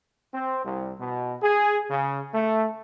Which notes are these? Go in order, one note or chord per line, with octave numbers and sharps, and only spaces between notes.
C4
C2
B2
G#4
C#3
A3